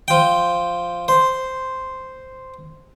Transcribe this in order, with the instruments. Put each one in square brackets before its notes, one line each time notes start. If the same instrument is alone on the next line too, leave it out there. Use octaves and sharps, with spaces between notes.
[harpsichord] F3 G5
C5